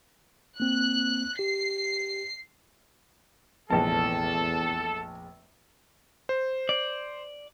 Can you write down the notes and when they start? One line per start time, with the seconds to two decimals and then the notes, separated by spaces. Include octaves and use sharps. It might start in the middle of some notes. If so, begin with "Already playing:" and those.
0.60 A#3 C4 F#6
1.39 G4 C7
3.70 F1 A#1 E2 G#3 A4 A5
6.29 C5
6.69 D5